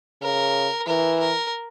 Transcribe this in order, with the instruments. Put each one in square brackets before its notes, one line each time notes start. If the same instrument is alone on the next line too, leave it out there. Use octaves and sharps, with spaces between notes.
[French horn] C#3 [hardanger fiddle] A#4
[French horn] E3 [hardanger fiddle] A#4
[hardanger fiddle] A#4